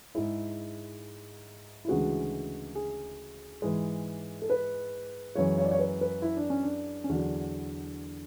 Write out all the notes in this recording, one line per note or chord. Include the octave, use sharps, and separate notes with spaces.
G#2 G#3 E4
E4
D2 C#3 E3 G#3 F#4
G#4
G#2 E3 G#3
A4
B4
F#2 E3 G#3 C#5
C#5
D5
C#5
B4
B4
E4
D4
C#4
D4
C#4
E2 D3 F#3 D4